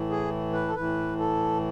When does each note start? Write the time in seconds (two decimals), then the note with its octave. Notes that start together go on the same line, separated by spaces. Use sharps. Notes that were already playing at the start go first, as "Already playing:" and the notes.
Already playing: A2 E3
0.10 G#4
0.53 B4
0.68 A4
0.75 A2 E3 B4
1.19 A4